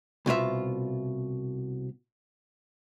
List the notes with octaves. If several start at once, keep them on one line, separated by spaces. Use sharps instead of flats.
C2 B2 F4 E5